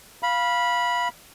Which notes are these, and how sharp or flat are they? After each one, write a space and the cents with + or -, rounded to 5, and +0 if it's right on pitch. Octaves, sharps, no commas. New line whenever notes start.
F5 +0 B5 -15